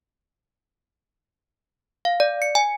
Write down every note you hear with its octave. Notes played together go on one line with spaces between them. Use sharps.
F5
D5
C#7
G#5